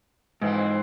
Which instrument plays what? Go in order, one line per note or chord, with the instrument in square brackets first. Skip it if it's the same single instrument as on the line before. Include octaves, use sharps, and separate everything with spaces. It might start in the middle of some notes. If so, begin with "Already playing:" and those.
[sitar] F2 E3 C4 [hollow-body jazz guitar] G#2